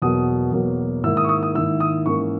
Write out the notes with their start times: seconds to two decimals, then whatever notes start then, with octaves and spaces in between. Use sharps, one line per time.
0.02 E2 B2 F#3 A#3 D#6
0.52 E2 B2 F#3 A#3
1.03 G#2 D#3 A#3 E4 E6
1.17 D#6
1.24 C#6
1.29 D#6
1.43 D#6
1.54 G#2 D#3 A#3 E4 E6
1.80 D#6
2.06 G#2 E3 A#3 C#4 E4 C#6